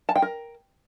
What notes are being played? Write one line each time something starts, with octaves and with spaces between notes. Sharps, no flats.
A5
G5
A#4